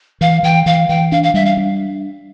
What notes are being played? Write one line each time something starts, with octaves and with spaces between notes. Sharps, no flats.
E3 F5
E3 G5
E3 F5
E3 G5
D4 F5
F5
G3 E5
F5
D4